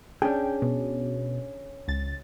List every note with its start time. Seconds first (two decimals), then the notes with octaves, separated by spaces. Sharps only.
0.22 C#4 D4 G#4 G5
0.62 B2
1.88 C#2 A6